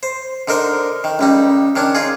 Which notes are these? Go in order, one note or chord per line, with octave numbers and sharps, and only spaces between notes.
C5
D3 D#4 A#4 C5 C6
D#3
C#2 G3 D#4
D#3 C#4 D4
D#4 F4 G#4